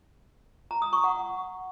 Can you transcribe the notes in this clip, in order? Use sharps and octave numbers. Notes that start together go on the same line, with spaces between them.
A#5
D#6
C#6
F#5